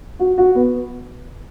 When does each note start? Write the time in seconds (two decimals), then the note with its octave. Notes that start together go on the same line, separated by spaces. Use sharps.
0.19 F#4
0.38 F#4
0.55 B3